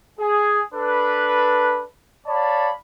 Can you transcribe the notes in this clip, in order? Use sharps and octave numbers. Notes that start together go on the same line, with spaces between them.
G#4
D4 A4 B4
C#5 D5 F5 A5 B5